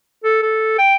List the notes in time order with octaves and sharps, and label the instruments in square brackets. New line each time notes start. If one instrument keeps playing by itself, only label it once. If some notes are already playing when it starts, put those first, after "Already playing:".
[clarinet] A4
A4
G5